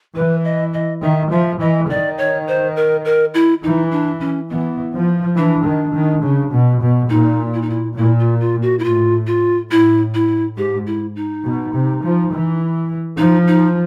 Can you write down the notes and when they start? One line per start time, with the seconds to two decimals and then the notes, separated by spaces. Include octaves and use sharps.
0.16 E3 B4
0.44 D#5
0.73 D#5
1.02 D#3 E5
1.31 F3 E5
1.60 E3 D#5
1.90 D#3 D5
2.18 C#5
2.47 C5
2.76 A#4
3.05 A#4
3.34 E4
3.63 E3 D#4
3.91 D4
4.20 C#4
4.50 E3 B3
4.94 F3
5.36 E3 D4
5.65 D#3
5.95 D#3
6.23 C#3
6.53 B2
6.81 B2
7.10 A#2 D#4
7.54 E4
7.62 D#4
7.70 E4
7.97 A#2 E4
8.19 F4
8.40 F4
8.62 F#4
8.79 E4
8.84 A2 F4
9.27 F4
9.71 A2 E4
10.14 E4
10.57 G#2 G4
10.86 E4
11.16 D#4
11.45 B2
11.73 C3
12.03 F3
12.32 E3
13.18 F3 D#4
13.47 D#4